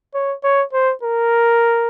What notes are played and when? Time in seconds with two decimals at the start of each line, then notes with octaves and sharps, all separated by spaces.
0.14 C#5
0.44 C#5
0.73 C5
1.03 A#4